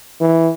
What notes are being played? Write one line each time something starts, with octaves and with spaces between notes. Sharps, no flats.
E3